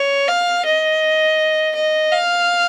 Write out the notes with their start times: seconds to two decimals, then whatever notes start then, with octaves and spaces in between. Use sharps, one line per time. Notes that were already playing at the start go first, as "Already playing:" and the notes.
Already playing: C#5
0.28 F5
0.65 D#5
1.75 D#5
2.12 F5